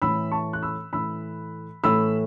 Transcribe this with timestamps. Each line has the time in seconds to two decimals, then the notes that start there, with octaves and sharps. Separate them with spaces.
0.02 A2 E3 A3 B5 E6
0.32 A5 C#6
0.53 F#6
0.62 B5 E6
0.93 A2 E3 A3 B5 E6
1.84 A2 E3 A3 B5 E6